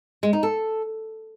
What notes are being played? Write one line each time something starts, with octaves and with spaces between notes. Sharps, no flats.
G#3
D#4
A4